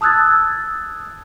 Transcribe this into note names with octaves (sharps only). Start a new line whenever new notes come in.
A5 D#6 E6 F#6 G#6 A6